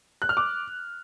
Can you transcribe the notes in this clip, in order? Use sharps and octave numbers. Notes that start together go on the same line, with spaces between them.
F#6
F6
D6